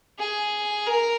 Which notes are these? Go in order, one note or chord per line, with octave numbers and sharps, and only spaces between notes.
G#4
A#4